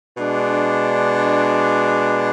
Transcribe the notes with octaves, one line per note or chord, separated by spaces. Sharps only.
B2 G#3 D4